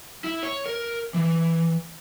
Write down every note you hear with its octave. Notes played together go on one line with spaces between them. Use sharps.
E4
C#5
A#4
E3